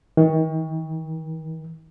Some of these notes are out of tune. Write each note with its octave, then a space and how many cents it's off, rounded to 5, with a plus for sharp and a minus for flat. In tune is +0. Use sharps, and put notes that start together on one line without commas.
D#3 +40